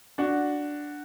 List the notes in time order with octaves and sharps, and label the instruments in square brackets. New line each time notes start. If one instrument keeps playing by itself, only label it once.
[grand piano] D4 F#4